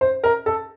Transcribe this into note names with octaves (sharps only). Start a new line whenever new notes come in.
C5
A#4
A4